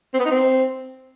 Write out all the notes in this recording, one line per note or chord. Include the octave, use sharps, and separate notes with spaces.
C4
B3
D#4
C4